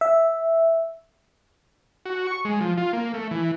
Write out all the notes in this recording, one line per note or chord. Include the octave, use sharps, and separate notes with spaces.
E5
F#4
C#6
G#3
F3
F4
A#3
A3
E3